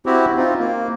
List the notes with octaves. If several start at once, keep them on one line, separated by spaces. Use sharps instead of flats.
C4 E4 F#4 G4
C4 D#4 F4
A#3